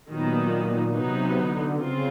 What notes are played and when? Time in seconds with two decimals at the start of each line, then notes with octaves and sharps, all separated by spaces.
0.10 A#2 D#3 F#3 B3 D#4
0.94 C3 F#3 B3 D#4
1.36 D3
1.78 C#3 C4 F4